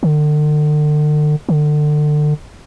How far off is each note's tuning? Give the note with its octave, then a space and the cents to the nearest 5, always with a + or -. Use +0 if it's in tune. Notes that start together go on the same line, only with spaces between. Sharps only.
D3 +40
D3 +30